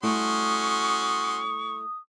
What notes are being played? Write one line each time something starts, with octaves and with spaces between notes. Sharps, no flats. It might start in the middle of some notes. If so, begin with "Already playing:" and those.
G3 A3 C#4 E4 F#4 C6 C#6 D#6